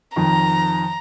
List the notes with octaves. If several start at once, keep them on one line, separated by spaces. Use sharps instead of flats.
F2 D#3 A#5